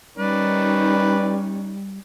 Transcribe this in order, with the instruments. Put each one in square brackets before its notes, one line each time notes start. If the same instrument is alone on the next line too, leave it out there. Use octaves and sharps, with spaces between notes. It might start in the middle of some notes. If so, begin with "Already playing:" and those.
[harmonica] D#3 B4 D5 [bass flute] G3 [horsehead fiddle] C#4 D#4